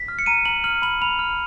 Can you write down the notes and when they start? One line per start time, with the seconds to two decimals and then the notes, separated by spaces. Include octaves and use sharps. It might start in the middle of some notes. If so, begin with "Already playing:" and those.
Already playing: B6
0.08 F6
0.19 C#7
0.26 A#5 D#7
0.45 A#5 F#7
0.64 F6 F#7
0.82 B5 F#7
1.02 B5 F7
1.19 F6